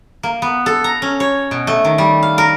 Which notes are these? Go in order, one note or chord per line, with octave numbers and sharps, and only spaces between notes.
A#3
B3
A4
A#5
C#4
C#5
B2
A3
D#3
G3
F5
A#4